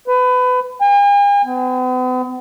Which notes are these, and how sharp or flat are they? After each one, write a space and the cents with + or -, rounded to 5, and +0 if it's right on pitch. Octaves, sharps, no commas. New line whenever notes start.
B4 +25
G#5 -45
B3 +45